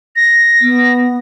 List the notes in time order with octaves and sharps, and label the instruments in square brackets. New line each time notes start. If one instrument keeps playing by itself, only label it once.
[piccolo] A#6
[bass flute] B3